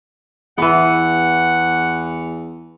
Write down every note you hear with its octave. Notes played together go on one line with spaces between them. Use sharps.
E2 E3 B3 F#5